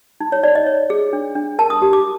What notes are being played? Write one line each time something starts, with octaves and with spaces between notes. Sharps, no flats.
D#4
C#5
D#4 D5
D#5
C#5
G#4
D4
D4
A#4 A5
D#6
G4
D6